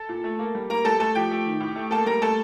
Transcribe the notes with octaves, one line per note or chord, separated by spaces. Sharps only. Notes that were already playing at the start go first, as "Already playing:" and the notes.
Already playing: A4 A5
A#2
A3
A#3
G3
A#3 A#4 A#5
G3 A4 A5
A3 A4 A5
F3 G4 G5
A3
D#3
A2
A3
A#3 A4 A5
G3 A#4 A#5
A3 A4 A5